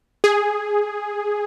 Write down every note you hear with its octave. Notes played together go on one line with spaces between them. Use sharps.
G#4